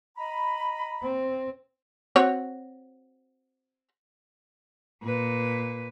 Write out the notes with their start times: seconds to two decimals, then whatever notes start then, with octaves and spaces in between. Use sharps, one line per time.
0.17 D#5 A#5 B5
1.03 C4
2.16 C4 F#4 C#5
5.03 A#2 B4